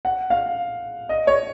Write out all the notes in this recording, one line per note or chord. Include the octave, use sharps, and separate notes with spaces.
F#5
F5
D#5
C#5